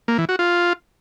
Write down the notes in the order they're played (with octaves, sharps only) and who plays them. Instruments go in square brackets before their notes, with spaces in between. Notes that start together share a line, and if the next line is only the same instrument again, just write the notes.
[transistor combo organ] A#3
E3
F#4
F4